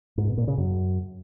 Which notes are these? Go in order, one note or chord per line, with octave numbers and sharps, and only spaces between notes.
G#2
B2
A#2
C#3
F#2